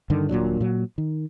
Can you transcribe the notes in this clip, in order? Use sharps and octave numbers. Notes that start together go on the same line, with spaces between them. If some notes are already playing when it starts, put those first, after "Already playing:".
G2 D3 D#3
D#1 A#2 F#3 D4
A#2 F#3
D#3